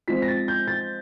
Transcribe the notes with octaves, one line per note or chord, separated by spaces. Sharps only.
F3 G#3 C4 B6
A#6
A6
G6
A6